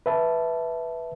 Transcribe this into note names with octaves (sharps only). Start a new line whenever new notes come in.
B4 E5 A5